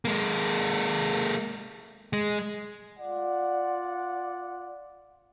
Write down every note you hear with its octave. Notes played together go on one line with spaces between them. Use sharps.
G#3 A#3
G#3
F4 D5 F#5